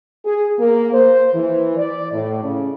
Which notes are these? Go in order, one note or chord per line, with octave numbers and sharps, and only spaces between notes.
G#4
A#3
C5
E3
D5
A2
C#3